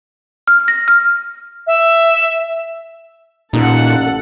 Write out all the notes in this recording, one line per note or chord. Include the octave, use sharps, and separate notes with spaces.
F6
A#6
F6
E5
A1 A#2 D#4 A4 F#5